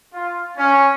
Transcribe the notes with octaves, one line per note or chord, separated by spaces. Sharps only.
F4
C#4